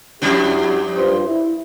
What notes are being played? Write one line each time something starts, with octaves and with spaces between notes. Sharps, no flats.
F2 G3 D4 E4 F#4 G4
G2 F4 C5
E4